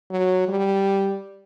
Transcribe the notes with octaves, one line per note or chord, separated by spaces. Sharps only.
F#3
G3